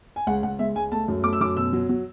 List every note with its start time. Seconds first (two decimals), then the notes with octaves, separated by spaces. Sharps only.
0.16 G#5
0.27 C#2 F#5
0.43 C#2 F#5
0.59 G#3 E5
0.76 C#2 G#5
0.92 A3 A5
1.08 F#2
1.24 A3 D6
1.33 E6
1.41 F#2 D6
1.57 B2 E6
1.73 F#3
1.89 F#3